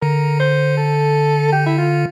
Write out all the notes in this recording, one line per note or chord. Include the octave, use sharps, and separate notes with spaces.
D3 A#4
C5
A4
G4
E4
F4